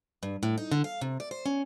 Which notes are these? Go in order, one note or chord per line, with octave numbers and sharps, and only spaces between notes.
G2
A2
D#4
D3
F5
C3
D5
C5
C#4